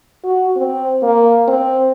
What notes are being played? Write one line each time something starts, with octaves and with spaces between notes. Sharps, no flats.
F#4
C4
A#3
C4